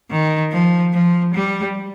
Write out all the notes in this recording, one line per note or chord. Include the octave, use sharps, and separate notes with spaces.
D#3
F3
F3
G3